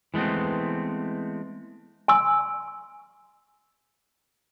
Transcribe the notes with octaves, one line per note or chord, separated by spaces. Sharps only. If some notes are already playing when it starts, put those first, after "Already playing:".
E3 G#3 A3 B3 C4
G#5 C6 E6